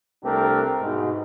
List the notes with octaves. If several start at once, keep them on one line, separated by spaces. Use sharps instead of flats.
C2 A3 C4 D4 G4 A#4
G#2 B2